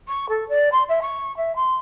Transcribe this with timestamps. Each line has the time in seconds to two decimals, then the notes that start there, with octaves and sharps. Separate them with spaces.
0.08 C#6
0.29 A4
0.48 D5
0.72 C6
0.88 E5
1.01 C#6
1.36 E5
1.55 C6